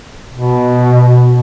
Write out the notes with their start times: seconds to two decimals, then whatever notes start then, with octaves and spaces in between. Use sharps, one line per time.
0.34 B2